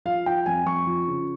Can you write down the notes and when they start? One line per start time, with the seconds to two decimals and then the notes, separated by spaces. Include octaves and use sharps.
0.05 F3 F5
0.26 F3 G5
0.46 F2 G#5
0.66 F2 C#6
0.87 F3
1.08 C#3